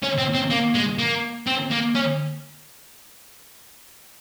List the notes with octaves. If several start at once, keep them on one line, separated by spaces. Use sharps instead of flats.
C#4
C4
C4
A#3
G#3
A#3
C4
A#3
C#4